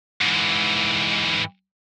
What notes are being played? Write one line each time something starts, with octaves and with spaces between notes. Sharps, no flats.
G#2 E3